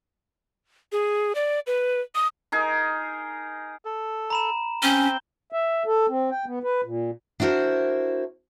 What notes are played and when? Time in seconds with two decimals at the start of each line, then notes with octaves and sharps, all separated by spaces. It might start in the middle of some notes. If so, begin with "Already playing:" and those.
0.92 G#4
1.35 D5
1.67 B4
2.15 D#6
2.52 D#4 G#4 A#4
3.85 A4
4.30 A#5 B5 E7
4.82 C4 C#4 G6 G7
5.52 E5
5.86 A4
6.08 C4
6.30 G5
6.46 B3
6.63 B4
6.84 A#2
7.40 D4 E4 F#4 A#4 C5